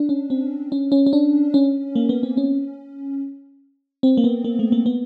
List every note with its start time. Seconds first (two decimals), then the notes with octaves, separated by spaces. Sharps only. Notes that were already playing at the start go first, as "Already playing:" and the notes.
Already playing: D4
0.09 C#4
0.30 C4
0.72 C#4
0.92 C#4
1.06 C#4
1.13 D4
1.54 C#4
1.96 A#3
2.09 B3
2.23 C4
2.37 C#4
4.03 C4
4.17 A#3
4.24 B3
4.44 A#3
4.59 A3
4.72 A#3
4.86 B3